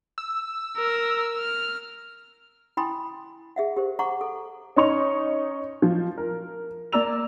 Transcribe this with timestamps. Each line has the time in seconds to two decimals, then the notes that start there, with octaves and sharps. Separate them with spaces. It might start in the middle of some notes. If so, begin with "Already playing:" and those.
0.18 E6
0.77 A#4
1.38 F6
2.77 E4 G5 G#5 B5 C6 D#6
3.56 G#4 E5 F#5
3.77 G4 A#4 C5
3.99 F#5 A#5 C#6 D6
4.21 A4
4.76 C#4 D#4 C#6 F7
5.82 F3
6.17 A#4
6.93 A#3 D5 A#5 E6 F7